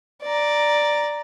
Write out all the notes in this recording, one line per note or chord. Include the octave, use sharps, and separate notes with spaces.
D5 A#5